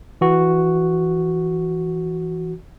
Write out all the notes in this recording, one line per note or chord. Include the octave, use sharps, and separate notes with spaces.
E3 F#4